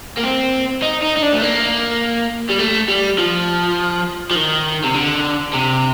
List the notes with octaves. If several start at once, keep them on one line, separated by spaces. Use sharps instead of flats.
A#3
C4
D#4
D#4
D#4
D4
A3
A#3
G3
A3
G3
F3
F3
D#3
C3
D3
C3